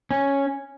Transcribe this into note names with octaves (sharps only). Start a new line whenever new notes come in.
C#4